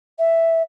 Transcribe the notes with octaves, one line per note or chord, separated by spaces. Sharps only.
E5